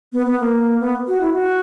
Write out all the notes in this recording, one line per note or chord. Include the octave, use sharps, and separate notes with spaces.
B3
B3
A#3
B3
F#4
E4
F#4